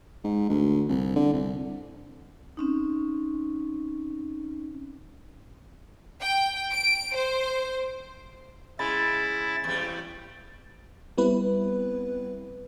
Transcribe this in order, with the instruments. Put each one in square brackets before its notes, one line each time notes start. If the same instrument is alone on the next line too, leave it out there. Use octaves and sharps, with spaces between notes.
[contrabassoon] G#2
D2
C2
D3
C2
[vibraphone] C4 C#4 D#4
[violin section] G5
D7
C5
[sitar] C#3 [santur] G#3 B5 [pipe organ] E4 [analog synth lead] A6
[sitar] E2 G3
[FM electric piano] G3 B3 C4 E4 B4